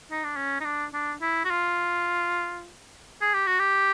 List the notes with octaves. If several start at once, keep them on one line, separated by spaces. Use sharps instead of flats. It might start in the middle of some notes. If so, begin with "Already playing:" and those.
D#4
D4
C#4
D#4
D4
D4
E4
F#4
F4
G#4
G4
F#4
G4